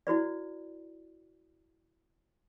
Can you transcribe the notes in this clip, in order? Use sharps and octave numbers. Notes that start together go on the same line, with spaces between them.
E4 F#4 B4 D5